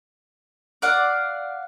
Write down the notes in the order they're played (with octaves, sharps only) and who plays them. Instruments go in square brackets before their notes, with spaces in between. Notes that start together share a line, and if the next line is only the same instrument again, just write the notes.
[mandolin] D5 F5 F#5